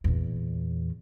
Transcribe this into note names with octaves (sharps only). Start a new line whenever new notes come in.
E2 A#2